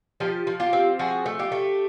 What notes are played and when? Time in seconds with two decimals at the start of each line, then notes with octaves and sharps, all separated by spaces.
0.20 F3 F4 G4
0.47 F3
0.60 F4 G4
0.73 C4
0.99 F3 F#4 G#4
1.26 A3
1.39 F4 G4
1.52 A3